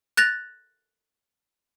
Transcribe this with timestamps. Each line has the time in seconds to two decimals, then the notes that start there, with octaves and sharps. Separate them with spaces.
0.17 F#6 A6 A#6 F7